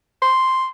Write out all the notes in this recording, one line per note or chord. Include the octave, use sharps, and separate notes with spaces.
C6